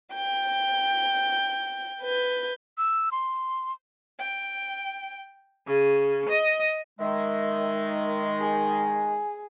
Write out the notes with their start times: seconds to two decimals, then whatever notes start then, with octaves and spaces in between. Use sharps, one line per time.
0.14 G5 G6
2.03 B4 G6
2.78 E6
3.12 C6
4.19 G5
5.67 C#3
6.29 D#5
6.99 D#3 G#3 E5
8.40 G#4